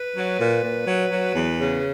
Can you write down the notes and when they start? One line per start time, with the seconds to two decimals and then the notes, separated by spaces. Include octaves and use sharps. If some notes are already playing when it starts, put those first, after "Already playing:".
Already playing: B4
0.16 F#3
0.40 A#2
0.64 A#2
0.87 F#3
1.11 F#3
1.35 E2
1.59 C#3